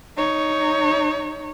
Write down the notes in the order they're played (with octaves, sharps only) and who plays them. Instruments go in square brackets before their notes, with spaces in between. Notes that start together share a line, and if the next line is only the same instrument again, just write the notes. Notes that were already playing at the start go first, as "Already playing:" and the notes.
[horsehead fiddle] D#4 C#5